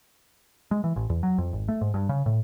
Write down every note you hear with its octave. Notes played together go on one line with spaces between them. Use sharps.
G#3
E3
A1
E2
F#3
F2
G#1
A3
G#2
G2
C#3
A2